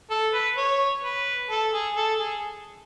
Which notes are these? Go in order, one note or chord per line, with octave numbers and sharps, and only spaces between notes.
A4
B4
C#5
B4
A4
G#4
A4
G#4